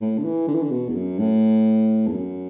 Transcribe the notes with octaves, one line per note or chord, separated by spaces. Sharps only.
A2
D3
E3
D3
E3
D3
B2
E2
F#2
A2
E2
F#2